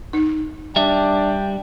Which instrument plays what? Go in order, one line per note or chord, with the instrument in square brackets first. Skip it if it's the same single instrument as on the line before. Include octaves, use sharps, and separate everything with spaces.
[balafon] D#4
[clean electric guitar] G3 E5 [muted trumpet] D4 [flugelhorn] G5